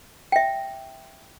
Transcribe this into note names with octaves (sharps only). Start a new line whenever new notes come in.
E5 G5